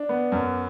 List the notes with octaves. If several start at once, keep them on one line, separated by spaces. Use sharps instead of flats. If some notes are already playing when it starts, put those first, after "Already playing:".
Already playing: D4
B3
F#2